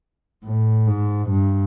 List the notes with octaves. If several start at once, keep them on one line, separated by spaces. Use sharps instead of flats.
A2
G#2
G2